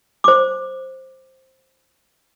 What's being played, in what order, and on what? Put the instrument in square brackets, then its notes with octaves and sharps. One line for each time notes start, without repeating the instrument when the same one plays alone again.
[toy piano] C5 D6